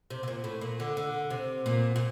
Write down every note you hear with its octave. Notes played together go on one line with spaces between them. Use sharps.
C3
C3
A#2
A2
A#2
D3
D3
C3
A#2
A#2